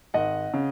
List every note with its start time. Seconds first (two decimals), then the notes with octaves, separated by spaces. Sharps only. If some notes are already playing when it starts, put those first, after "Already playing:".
0.14 G#1 D#5 F#5
0.54 C#3